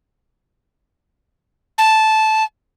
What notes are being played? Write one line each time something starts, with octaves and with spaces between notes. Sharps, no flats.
A5